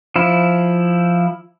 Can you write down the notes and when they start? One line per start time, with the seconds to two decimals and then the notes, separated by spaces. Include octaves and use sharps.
0.16 F3 E4